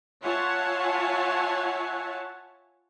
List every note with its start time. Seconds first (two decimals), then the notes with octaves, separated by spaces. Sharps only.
0.21 F4 C#5 E5 F#5 G#5 A5